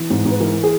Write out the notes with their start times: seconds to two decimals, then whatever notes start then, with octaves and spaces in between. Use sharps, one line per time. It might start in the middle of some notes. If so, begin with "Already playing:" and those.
Already playing: E3
0.10 G#2
0.25 G#2
0.31 B4
0.40 E3 A#4
0.64 G#4